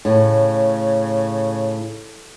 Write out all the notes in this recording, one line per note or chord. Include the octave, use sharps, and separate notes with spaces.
A2 C#3